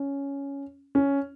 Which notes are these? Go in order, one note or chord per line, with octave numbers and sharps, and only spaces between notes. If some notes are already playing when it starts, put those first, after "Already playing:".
Already playing: C#4
C#4